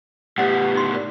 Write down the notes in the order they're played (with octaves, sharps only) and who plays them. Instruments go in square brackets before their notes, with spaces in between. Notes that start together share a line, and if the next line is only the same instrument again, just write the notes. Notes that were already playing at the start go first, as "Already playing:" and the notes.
[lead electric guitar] A2 B3 [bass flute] G4 [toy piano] C#5 D#5 F#5
[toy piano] D#4 C6
A#4 D5